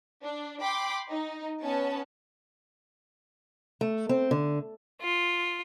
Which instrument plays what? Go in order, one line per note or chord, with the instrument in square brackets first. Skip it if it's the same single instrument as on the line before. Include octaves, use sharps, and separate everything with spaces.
[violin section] D4
G5 B5 C6 D6
D#4
B3 C#4 A5
[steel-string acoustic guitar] A3
C4
D3
[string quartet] F4